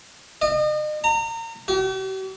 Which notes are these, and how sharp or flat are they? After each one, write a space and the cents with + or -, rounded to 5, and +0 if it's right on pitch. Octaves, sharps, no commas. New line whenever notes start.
D#5 -40
A#5 -30
G4 -45